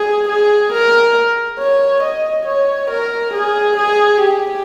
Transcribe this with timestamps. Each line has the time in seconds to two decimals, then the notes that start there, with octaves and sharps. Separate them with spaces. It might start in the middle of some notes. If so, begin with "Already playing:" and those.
Already playing: G#4
0.29 G#4
0.73 A#4
1.59 C#5
2.04 D#5
2.46 C#5
2.91 A#4
3.34 G#4
3.77 G#4
4.21 G4